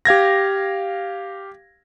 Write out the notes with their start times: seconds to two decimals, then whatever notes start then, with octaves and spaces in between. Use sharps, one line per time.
0.05 G4 F5 G#6 A#6